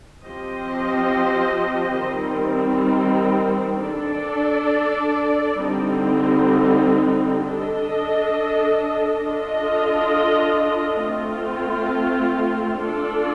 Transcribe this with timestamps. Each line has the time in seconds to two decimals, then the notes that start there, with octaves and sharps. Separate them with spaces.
0.25 F3 C4 G4 C5 D#5
2.04 D#3 G3 C4
3.84 D4 A4 D5
5.64 D3 G3 C4 D#4
7.44 D4 A4 D#5
9.24 D4 F4 A4 D#5
11.05 A3 C4 F4
12.84 D4 F4 A4 D5